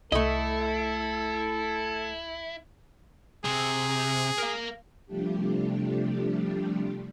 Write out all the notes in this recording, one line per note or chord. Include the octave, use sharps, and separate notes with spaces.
C2 A3 E4 A4 D#5
C3 G#4
A#4 F5
C3 F3 G3 A3 D4 G4